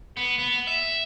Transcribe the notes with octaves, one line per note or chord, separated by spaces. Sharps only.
B3
B3
E5